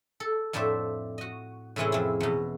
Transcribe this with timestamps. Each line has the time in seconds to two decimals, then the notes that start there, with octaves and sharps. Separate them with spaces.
0.20 A4
0.53 F2 A2 D4 A4 C5 E5
1.18 F#4 D#5
1.76 A2 C3 E3 G#3 C#4 E4
1.92 F2 E4
2.20 E2 B2